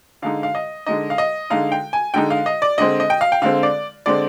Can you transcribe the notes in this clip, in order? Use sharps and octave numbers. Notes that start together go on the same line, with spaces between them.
D3 G#3 D#4 F5
F5
D#5
D3 G#3 D#4 D#5
F5
D#5
D3 G#3 D#4 F5
G5
G#5
D3 G#3 D#4 G5
F5
D#5
D5
D3 G#3 C4 D#5
D#5
G5
F5
G5
D3 G#3 C4 F5
D5
D3 G#3 C4 D5